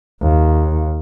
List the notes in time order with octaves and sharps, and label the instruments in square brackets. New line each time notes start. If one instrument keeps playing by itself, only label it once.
[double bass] D#2